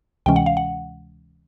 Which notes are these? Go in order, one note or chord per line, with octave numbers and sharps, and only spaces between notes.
D2 C3 E3 G#3 C#4 G5
F#5
F5
F#5